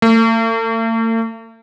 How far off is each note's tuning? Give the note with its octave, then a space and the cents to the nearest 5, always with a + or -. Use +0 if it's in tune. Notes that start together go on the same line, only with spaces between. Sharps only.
A3 +45